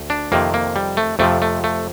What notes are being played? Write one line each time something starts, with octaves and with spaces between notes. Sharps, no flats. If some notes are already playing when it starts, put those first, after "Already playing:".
Already playing: D2
D4
F2 C3 D#3 A#3
A#3
G3
A3
F2 C3 F3 A3
A3
A3